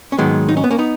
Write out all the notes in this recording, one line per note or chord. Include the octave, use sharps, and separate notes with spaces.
C#4
G#2 D#3 F#3 G#3 B3
D#4
C#4
B3
A#3 C#4
B3 D#4